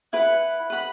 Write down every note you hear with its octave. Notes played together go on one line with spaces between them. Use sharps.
E4 B4 F#5
B4 F#5 B5